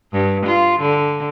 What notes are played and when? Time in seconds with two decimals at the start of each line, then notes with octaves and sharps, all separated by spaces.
0.13 G2
0.46 F4
0.80 D3